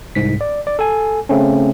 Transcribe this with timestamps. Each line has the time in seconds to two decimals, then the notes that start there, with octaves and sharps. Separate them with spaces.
0.15 C2 G#2 B6
0.41 D5
0.67 D5
0.79 A4 G#5
1.29 C#3 A3 C4 C#4